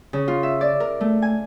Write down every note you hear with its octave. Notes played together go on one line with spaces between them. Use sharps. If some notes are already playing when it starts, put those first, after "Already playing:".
C#3
F4
E5
D5
A#4
A3
G#5